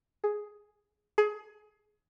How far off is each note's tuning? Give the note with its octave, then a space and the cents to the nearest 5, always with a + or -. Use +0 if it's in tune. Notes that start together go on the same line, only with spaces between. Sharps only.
G#4 +5
G#4 +25